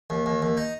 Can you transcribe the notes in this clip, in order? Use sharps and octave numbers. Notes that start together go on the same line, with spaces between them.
D#2
D#2
D#2
D#4